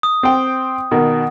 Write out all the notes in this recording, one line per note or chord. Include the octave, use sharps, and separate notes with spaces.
D#6
C4 G5
B2 D#3